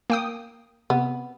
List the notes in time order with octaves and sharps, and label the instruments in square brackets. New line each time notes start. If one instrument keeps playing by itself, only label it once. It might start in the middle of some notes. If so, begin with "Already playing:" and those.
[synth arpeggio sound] A#3 G5 D#6
[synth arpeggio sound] C3 [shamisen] B3